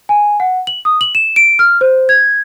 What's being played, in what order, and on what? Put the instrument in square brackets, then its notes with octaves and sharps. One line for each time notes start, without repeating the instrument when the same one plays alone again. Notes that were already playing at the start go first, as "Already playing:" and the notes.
[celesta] G#5
F#5
F#7
D#6
F#7
E7
D7
F6
C5
G#6